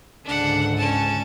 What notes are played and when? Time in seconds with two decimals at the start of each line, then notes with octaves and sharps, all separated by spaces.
0.25 C#2 G#2 D3 D4 F#5
0.77 C#4 A5